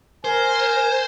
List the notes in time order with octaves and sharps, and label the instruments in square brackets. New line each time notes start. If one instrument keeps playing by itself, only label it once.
[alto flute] A#4 [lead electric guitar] C5 [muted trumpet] G#5